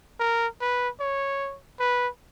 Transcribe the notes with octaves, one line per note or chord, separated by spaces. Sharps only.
A#4
B4
C#5
B4